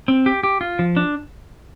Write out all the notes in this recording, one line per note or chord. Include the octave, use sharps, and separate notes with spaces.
C4
G4
G4
F4
F3
D4